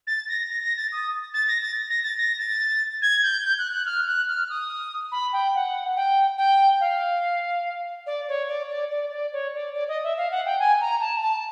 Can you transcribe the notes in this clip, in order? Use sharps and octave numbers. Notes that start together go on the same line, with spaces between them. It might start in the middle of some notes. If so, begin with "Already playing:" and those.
A6
A#6
A#6
A#6
A6
D#6
A6
A#6
A6
A#6
A6
A#6
A6
G#6
G6
G6
F#6
F#6
F6
F#6
F6
D#6
B5
G5
F#5
G5
G5
F5
D5
C#5
D5
D5
D5
D5
C#5
D5
D5
D#5
E5
F5
F#5
G5
G#5
A#5
A5
A5